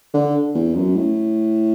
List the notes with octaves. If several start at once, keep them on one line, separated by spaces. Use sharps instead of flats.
D3
E2
F#2
A2